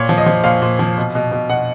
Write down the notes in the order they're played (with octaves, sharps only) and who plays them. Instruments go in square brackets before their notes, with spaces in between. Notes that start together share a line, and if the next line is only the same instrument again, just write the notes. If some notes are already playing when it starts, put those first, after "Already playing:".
Already playing: [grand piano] A#2 C#5
F3
D#5
F3
A#2 F5
A#2
F3
B2
B2
B2
B2 F#5